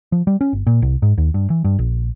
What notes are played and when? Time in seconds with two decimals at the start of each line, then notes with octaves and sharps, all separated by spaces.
0.12 F3
0.27 G3
0.41 C#4
0.53 G1
0.67 A#2
0.82 C2
1.02 G#2
1.18 D#2
1.34 G2
1.50 E3
1.65 G2
1.79 A#1